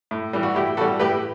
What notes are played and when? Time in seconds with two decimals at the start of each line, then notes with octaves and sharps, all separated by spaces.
0.11 A2
0.33 E3 G3
0.43 F#4
0.55 A2 E4 G4
0.77 E3 F#4 A4
0.81 G3
0.99 A2 G4 B4